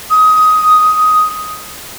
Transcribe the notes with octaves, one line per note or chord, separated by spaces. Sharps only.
D#6